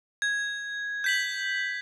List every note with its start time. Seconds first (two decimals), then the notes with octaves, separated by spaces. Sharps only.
0.22 G#6
1.04 G6 B6 F#7